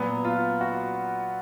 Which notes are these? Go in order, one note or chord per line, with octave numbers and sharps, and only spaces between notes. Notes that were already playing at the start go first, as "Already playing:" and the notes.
Already playing: A#2 F#3 B3
F4
F#4